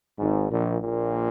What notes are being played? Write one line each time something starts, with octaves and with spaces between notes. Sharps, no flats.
G#1 G#2
A#1 A#2
A#1 A#2